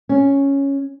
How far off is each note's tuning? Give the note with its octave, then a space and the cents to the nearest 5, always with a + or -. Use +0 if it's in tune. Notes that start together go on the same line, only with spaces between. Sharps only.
C#4 +0